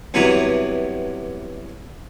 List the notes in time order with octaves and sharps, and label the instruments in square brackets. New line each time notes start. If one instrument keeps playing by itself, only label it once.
[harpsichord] G2 C3 E3 F#3 B3 A#5